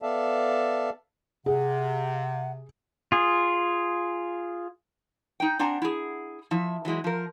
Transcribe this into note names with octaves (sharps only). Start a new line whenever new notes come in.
B3 A4 D5 E5 F5 A5
C3 G#4 F#5
F4 G#4
D#4 G5
C4 D4 F#5 G#5 A#5
E4 G#4
F3 E4 E5
E3 F#3 G#3 E4
F3 A#4